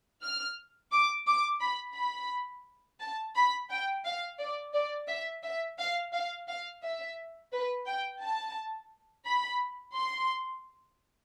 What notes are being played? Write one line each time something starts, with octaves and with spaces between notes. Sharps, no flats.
F6
D6
D6
B5
B5
A5
B5
G5
F5
D5
D5
E5
E5
F5
F5
F5
E5
B4
G5
A5
B5
C6